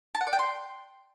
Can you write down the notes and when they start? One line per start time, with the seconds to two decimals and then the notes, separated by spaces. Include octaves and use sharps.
0.15 A5
0.21 F#5
0.27 D5
0.33 G5
0.39 C6